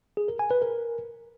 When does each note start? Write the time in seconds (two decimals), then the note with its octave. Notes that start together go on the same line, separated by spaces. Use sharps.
0.17 G#4
0.28 A#4
0.39 G#5
0.51 B4
0.62 A#4